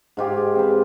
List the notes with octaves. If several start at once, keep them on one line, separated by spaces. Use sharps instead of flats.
G#2 F4 G4 G#4
C4 B4